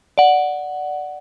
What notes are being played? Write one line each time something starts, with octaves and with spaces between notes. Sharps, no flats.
D5 F#5